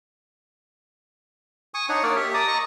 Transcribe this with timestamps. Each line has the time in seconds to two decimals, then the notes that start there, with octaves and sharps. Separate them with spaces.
1.74 G#5 C#6 D#6
1.89 D4 D#4 C#5 F#5
2.03 A#3 C#5 D5 F5
2.16 G4 E5
2.34 D5 A5 A#5 D#6
2.48 D#5 A#5 C#6